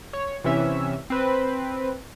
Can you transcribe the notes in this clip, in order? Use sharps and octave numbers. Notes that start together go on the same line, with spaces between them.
C#5
C3 E3 C#4 E5
C4 B4